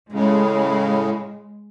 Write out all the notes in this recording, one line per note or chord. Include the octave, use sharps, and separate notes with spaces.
A2 C#3 G#3